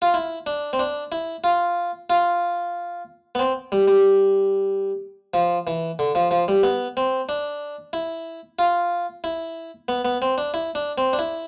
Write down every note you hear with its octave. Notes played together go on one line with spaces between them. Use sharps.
F4
E4
D4
C4
D4
E4
F4
F4
B3
C4
G3
G3
F3
E3
D3
F3
F3
G3
B3
C4
D4
E4
F4
E4
B3
B3
C4
D4
E4
D4
C4
D4
E4